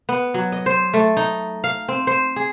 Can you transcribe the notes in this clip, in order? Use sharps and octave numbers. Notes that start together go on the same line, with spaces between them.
B3
F#3
D#5
C5
A3
D#4
F5
C4
C5
G#4